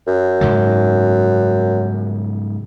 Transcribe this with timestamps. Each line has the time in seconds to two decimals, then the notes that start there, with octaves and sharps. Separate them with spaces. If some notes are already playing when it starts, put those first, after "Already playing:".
0.07 F#2
0.41 G#2 C#3 F#3